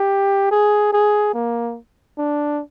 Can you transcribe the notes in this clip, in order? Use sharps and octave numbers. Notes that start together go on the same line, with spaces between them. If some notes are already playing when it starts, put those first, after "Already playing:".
Already playing: G4
G#4
G#4
A#3
D4